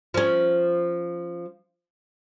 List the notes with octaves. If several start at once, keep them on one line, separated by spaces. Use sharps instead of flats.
F3 C#4